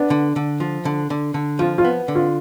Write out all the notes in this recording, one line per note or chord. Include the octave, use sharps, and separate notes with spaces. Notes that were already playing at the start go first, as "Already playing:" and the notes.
Already playing: B3 D4
D3
D3
F3
D3
D3
D3
F3 F4
F4
B3
D3
F4